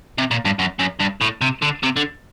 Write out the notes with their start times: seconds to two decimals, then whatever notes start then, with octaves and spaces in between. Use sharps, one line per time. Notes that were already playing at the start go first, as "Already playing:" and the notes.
0.18 C3
0.31 A#2
0.45 G2
0.59 F#2
0.79 F#2
1.00 G2
1.21 A2
1.41 C3
1.62 D3
1.83 C3
1.96 D3